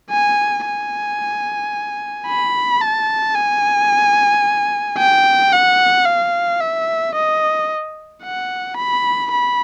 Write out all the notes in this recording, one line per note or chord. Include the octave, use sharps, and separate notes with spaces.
G#5
G#5
B5
A5
G#5
G5
F#5
F5
E5
D#5
F#5
B5
B5